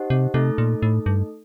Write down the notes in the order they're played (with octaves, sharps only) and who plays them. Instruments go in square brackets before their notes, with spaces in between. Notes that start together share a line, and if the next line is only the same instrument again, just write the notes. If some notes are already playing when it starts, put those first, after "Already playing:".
Already playing: [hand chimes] D#4 G4 C5 D#5 F#5
[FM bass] C3
[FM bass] C3 [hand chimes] A3 D#4 A4
[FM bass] A#2
A2
G2